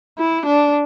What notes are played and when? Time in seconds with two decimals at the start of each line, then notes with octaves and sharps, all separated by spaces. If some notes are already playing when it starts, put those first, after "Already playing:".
0.18 E4
0.46 D4